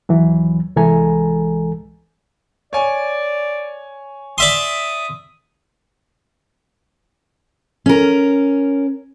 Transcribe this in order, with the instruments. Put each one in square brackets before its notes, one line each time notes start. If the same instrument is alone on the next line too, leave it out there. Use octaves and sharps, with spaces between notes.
[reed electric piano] D#2 E3 F#3
C2 E3 G#3 A4 G#5 A#5
[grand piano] C#5 G#5 [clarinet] D5
[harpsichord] D5 E5 C6 [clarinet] D#6
[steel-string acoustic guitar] C#4 A#4